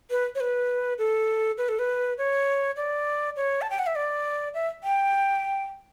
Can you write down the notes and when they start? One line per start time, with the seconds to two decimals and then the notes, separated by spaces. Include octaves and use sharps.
0.10 B4
0.35 C#5
0.40 B4
0.98 A4
1.58 B4
1.69 A4
1.79 B4
2.18 C#5
2.77 D5
3.36 C#5
3.62 A5
3.70 G5
3.79 F#5
3.87 E5
3.96 D5
4.54 E5
4.84 G5